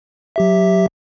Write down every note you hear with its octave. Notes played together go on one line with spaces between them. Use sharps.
F#3 G4 E5